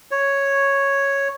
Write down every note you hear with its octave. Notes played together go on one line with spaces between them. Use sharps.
C#5